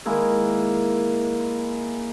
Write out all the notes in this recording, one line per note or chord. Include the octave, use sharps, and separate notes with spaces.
D#3 G#3 A#3 E4